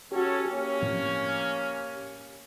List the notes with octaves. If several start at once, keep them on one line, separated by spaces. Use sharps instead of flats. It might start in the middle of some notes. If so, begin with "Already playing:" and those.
C#4 F#4 G4 A4 C#5
A#3 C#4 G4
A2 F3 C4